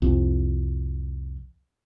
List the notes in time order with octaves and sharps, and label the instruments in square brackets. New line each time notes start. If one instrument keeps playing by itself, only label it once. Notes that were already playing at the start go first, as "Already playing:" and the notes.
[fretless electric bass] C2 F2